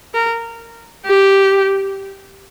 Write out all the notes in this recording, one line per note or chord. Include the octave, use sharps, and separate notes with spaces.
A#4
G4